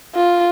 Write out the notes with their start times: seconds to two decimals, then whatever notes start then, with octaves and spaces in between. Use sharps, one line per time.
0.15 F4